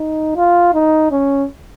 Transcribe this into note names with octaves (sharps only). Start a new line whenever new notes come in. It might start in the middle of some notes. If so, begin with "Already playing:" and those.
Already playing: D#4
F4
D#4
C#4